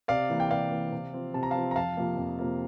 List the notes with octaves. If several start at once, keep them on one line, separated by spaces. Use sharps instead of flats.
C3 D5 F5
E3 A#3
G5
C3 D5 F5
E3 A#3
C3
F3 C4
C3 A5
A#5
F3 C4 F5 A5
A#5
F2 F5 A5
C3 F3 A#3
F2
C3 F3 A#3